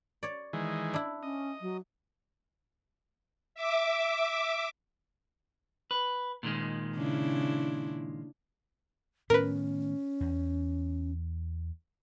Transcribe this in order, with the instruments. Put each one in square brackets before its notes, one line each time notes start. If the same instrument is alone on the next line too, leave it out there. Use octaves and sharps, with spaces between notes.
[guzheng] C#5 D5
[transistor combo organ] D#3 E3 G#3
[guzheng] D4 E4
[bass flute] C#4 [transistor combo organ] D#5
[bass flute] F#3
[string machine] E5 D6
[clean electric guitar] B4
A#2 D#3 G#3
[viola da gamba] C#3 D4 E4
[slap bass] A2 D#3 B3 [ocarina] C#4 [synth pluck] A#4 B4
[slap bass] E2